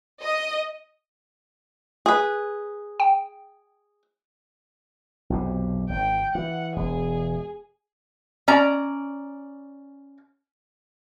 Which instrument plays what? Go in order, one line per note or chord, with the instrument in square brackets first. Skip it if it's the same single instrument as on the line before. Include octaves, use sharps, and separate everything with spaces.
[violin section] D#5
[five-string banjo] G#4 B4
[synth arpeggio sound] G5
[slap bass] B1 F2 C3
[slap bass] G#1 [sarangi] G5
[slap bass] E3 [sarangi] F#5
[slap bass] E1 [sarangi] G#4
[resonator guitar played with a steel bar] C#4 D5 A#5